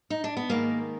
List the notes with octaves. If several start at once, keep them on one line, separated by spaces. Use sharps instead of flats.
D#4
D4
B3
G#2 D#3 A#3